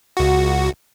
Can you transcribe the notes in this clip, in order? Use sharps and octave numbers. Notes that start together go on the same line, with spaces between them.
C#2 F#4